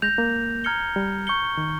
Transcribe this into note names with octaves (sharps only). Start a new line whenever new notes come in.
G#3 G6 A#6 F7
A#3
A#5 F6 G#6 C#7 G7
G3
C#6 G6 C#7 G7
D#3